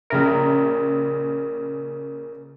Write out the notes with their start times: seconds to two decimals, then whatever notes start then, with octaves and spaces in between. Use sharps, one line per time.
0.10 A#1 C#3 A#4 E5